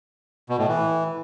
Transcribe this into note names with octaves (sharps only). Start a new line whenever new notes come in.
B2
A2
E3